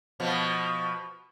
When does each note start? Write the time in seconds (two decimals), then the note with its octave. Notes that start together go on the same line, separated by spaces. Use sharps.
0.20 B2 F3 B3